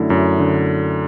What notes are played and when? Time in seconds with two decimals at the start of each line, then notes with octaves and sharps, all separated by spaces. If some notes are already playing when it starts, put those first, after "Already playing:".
Already playing: F#2 D3 A3 E4
0.10 F#2
0.39 D3